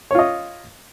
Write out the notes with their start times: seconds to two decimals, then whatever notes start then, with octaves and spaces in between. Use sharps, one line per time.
0.11 C#5
0.15 F4
0.19 D#5